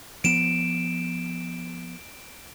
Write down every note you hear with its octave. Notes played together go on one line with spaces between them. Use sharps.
F3 B3 D7 E7